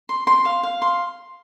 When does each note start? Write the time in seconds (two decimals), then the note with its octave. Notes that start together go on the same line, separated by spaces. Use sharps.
0.09 C6
0.27 C6
0.45 F5
0.63 F5
0.82 C6